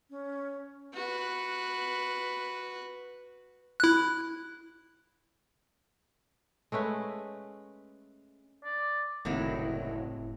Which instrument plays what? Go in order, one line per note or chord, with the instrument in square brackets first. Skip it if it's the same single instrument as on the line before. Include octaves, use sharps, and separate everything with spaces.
[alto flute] C#4
[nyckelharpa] F#4 B4
[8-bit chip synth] E4 F#6
[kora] G#3 A3 C#4 B4
[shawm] D5
[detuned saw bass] F#1 [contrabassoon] C2 [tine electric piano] A2 [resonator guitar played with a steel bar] D#3 F#3 E4